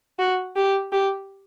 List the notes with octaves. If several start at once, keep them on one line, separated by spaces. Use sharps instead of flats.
F#4
G4
G4